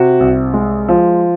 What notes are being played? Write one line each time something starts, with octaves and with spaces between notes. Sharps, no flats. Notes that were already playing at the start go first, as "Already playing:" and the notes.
Already playing: C3 F#4
C2
G#3
F3